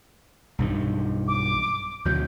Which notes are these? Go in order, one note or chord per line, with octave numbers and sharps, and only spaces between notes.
B1 G2 D#3
D6
D2 B2 F#3 G6